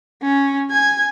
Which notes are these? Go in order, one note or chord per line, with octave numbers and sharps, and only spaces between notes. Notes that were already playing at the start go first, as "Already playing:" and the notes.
C#4
G#5 G#6